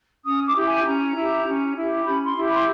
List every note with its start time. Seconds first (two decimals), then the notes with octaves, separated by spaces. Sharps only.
0.25 C#4 D#6
0.45 D6
0.55 E4 G4
0.65 G#5
0.85 C#4 A#5
1.16 E4 G4
1.46 C#4
1.76 E4 G4
2.05 C#4 B5
2.25 C6
2.36 E4 G4
2.46 B5
2.55 C6